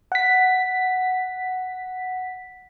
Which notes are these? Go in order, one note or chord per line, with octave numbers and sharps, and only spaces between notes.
F#5 B6